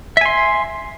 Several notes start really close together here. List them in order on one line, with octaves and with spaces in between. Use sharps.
E5 G#5 C6